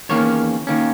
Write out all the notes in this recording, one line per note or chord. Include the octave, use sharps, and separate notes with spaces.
E2 D#3 A#3 C#4 C#5
D#3 A#3 C#4